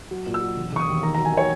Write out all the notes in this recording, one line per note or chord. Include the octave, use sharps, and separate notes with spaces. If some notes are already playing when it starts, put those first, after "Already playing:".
F#3
A#2
E6
F#3
E1
E1 C#6
D#6
D#2
D#3 A#5
A#5
F#3
G#5
D#3 C#5